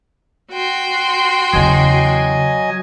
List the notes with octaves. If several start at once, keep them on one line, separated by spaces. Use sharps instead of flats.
F#4 G5 C6
E2 C#3 F#3 D#5 G#5